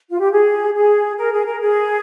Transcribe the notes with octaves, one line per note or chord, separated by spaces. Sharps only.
F4
G4
G#4
G#4
A#4
G#4
A#4
G#4